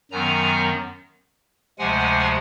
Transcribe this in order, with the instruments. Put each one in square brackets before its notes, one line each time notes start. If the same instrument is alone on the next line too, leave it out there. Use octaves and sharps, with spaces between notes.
[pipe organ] F#2 D#3 F#3 B3 G#5 A#5
D2 C3 F3 G#3 F#5 G#5